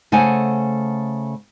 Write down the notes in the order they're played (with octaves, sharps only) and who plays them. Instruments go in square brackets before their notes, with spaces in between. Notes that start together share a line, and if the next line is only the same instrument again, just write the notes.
[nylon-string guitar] C#3 A3 C5 F#5 G#5